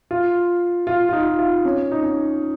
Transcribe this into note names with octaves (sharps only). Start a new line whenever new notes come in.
F4
F4
F4
D#4
F4
C#4
D#4
C#4